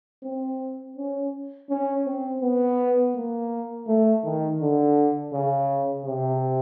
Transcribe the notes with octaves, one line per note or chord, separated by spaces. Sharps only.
C4
C#4
C#4
C4
B3
A#3
A3
D#3
D3
C#3
C3